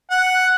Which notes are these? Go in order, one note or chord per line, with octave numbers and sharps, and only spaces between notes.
F#5